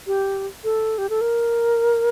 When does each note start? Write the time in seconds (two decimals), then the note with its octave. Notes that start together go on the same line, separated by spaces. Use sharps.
0.07 G4
0.64 A4
0.98 G4
1.10 A4
1.21 A#4